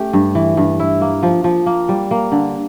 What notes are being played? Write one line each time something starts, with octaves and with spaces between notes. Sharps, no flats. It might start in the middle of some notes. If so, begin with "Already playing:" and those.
Already playing: A3 C#4 G4
G2
E3
G2
E4
A#3
F3
F3
A#3
G3
A#3
D3